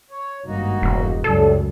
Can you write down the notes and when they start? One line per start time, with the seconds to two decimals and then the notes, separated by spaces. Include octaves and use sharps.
0.11 C#5
0.46 G#1 G2 A#3 D#4 F#4
0.82 E1
1.24 C#2 F#2 A2 G3 A4